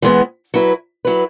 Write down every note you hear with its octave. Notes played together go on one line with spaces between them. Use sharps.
E3 G#3 B3
F#3 E4 B4
F#3 E4 B4